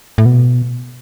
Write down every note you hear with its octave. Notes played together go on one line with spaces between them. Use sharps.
A2
B2